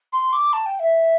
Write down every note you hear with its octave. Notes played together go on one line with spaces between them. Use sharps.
C6
D6
A5
G5
E5